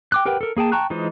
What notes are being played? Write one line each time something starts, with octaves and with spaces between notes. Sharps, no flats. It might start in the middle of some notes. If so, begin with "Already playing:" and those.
G5 D6 F#6
G4 A#4 B4 F#5 G5
A4 A#4
A#3 G#4 G5 A5
G5 A5 A#5 C#6 F#6
E3 G#3 D#4 F4 C5